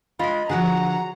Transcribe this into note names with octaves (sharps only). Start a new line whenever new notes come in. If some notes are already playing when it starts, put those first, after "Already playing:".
G#3 F4 D#5 B5
D3 F3 F#3 F#4 G#4 F#5 A#5